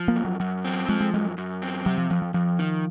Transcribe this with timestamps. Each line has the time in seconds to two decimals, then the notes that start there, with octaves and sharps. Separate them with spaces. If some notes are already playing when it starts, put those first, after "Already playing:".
Already playing: F3
0.08 A#3
0.16 F#2
0.25 F#3
0.40 F#2 F#3
0.65 C4
0.89 F3 G#3
1.01 G#3
1.14 F#2 G#3
1.38 F#2
1.62 C4
1.86 C3 F#3
1.98 F3
2.10 F2 F3
2.22 F3
2.34 F2 F3
2.59 D#3